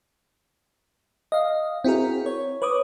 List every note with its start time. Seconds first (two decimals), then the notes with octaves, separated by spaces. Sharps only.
1.32 D#5 F5
1.84 C4 E4 F#4 G#4 A#4
2.26 C#5
2.62 B4 C#5 D6 D#6